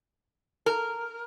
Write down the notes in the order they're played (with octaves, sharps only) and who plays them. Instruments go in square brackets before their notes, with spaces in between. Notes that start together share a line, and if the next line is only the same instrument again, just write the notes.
[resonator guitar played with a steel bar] A#4